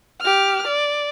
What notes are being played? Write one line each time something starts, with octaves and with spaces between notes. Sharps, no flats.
G4 F6
D5